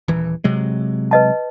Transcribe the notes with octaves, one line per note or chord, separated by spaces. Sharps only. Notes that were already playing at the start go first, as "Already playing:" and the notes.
D#1 E3
C3 F#3 G#3
B4 D#5 A5